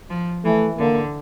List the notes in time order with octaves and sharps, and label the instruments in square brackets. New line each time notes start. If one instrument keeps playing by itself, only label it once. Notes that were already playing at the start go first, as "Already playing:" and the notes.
[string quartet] F3
[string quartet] E3 [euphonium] A3
[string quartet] D3 [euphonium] A#3